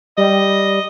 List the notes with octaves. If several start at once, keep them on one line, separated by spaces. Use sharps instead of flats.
G3 D#5